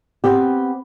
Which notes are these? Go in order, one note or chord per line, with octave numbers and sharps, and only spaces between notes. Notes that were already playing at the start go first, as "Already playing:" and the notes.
B3 C4 G4